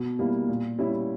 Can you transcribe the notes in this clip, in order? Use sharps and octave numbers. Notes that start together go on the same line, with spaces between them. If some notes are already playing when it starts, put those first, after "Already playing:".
Already playing: B2
G3 A#3 E4
A#2
G3 C#4 E4